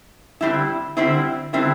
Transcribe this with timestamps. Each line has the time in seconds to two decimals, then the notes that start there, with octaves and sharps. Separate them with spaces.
0.41 D3 G3 C4 E4
0.97 D3 G3 C4 E4
1.53 D3 G3 C4 E4